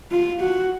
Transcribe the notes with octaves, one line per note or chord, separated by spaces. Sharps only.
F4
F#4